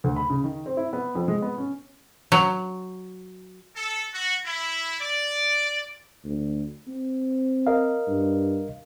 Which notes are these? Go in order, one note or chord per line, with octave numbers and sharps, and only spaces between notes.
D2
B5
C#3
D#3
C4
E4
B3
F2
G#3
B3
C#4
F#3
A4
F#4
E4
D5
D2
C4
A#4 D#5 F5
G2